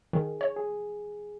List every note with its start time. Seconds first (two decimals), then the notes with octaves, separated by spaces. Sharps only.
0.13 D#3 G#4
0.41 C#5
0.56 G#4